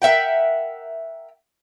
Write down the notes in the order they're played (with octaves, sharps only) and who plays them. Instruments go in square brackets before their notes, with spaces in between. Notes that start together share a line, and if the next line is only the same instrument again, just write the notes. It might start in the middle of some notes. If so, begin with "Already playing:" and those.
[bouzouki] A#4 E5 F#5 G5